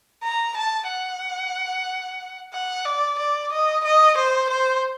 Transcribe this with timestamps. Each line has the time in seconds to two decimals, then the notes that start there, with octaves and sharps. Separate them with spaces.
0.23 A#5
0.57 A5
0.89 F#5
2.53 F#5
2.85 D5
3.19 D5
3.52 D#5
3.84 D#5
4.17 C5
4.50 C5